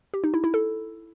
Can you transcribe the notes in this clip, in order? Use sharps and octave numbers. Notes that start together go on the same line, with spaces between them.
G4
D#4
E4
E4
A4